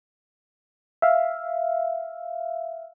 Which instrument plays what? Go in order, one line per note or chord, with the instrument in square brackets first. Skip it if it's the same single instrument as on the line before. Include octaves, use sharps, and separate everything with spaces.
[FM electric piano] E5 F5